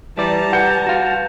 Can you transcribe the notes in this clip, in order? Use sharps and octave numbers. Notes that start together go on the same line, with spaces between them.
E3 G3 D5 A5 A#5
B4 F#5 G6 C#7
F#4 F5